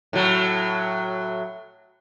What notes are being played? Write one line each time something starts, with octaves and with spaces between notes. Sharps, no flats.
A2 F#3